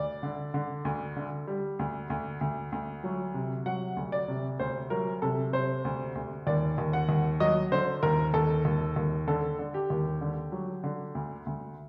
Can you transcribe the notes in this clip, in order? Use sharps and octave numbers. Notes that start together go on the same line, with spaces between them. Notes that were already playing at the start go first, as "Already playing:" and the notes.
Already playing: D2 D5
D3
D3
D2
D3
G3
D2
D2
D2
D2
F#3
C3
F#3 F#5
D2
D5
C3
D2 C5
F#3 A#4
C3 A4
C3 C5
D2
D2
D#2 D5
D#2
F#5
D#2
F#3 D#5
D3 C5
D#2 A#4
D#2 A4
D#2
D#2
D3 A4
D3
G4
D#2
D3
F#3
D3
D2
D2